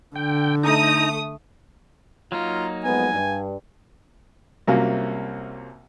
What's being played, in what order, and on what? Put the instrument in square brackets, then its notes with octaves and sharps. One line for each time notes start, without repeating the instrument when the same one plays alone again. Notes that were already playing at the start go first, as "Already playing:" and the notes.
[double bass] D3 [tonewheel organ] G5
[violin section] A3 D#6 [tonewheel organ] D#4 A#5
[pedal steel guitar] F#3 A#3 D#4 [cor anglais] F4
[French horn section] F2 G#3 B3 [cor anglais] G#5
[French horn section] G2
[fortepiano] C2 C3 F#3 A#3 C#4 F4